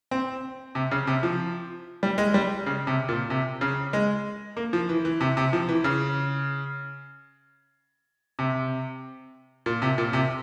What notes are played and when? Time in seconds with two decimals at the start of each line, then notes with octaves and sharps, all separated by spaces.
0.11 C4
0.75 C3
0.91 C#3
1.07 C3
1.23 F3
2.03 G3
2.18 G#3
2.34 G3
2.66 C#3
2.87 C3
3.09 A#2
3.30 C3
3.61 C#3
3.93 G#3
4.57 A#3
4.73 F3
4.89 E3
5.05 E3
5.21 C3
5.37 C3
5.53 F3
5.69 E3
5.84 C#3
8.39 C3
9.66 A#2
9.82 C3
9.98 A#2
10.13 C3